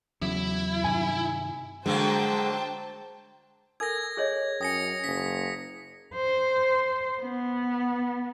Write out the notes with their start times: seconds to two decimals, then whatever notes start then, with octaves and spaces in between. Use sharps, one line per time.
0.22 E2 C#3 F#3 E4
0.84 G2 C3 D#3 G#5
1.86 D3 F#3 G#3 A#3 C5 G5 A5
3.80 A4 A#4 G#5 G#6 A#6
4.17 G#4 C#5 D#5
4.61 F#2 G5 G#5 D#6 A#6 C#7
5.04 F#1 B6
6.15 C5
7.21 B3